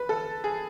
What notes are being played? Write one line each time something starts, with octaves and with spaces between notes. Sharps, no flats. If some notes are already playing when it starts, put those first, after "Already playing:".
Already playing: B4
A4
G#4